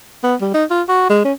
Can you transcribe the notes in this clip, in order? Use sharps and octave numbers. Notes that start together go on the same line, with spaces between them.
B3
G3
D#4
F4
F#4
G#3
C#4